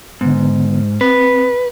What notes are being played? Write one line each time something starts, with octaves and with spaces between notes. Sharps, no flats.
G#2 D3 B3
C4 B4